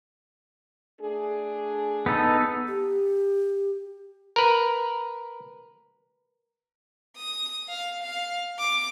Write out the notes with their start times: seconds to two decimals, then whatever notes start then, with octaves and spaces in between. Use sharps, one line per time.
1.01 A3 D4 G#4
2.06 B3 D#4 A4
2.68 G4
4.36 A#4 B4
7.17 D#6
7.68 F5
8.03 F5
8.59 D6